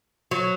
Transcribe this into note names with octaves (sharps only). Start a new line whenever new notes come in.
F#3